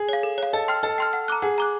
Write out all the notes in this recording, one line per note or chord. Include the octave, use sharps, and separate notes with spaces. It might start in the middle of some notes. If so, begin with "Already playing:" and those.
Already playing: G#4
C#5 F5
A4
C#5 F5
A4 D#5
G5 C6 F6
A4 D#5
G5 C6 F6
F#5
A#5 D6 F#6
G#4 F#5
A#5 D6 F#6